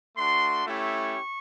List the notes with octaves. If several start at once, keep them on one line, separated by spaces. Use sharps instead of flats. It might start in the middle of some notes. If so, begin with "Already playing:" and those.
A3 D4 F#4 C6
A3 C#4 E4 G4 C#6